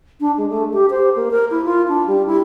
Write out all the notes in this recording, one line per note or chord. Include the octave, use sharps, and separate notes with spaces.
D4
G#3
A3
G4
C5
A#3
A#4
E4
F4
D4
G3
E4